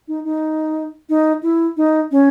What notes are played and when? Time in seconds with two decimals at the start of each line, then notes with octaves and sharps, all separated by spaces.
0.08 D#4
0.25 D#4
1.09 D#4
1.43 E4
1.77 D#4
2.11 C#4